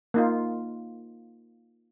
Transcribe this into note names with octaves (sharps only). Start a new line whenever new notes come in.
A#3 D#4 F4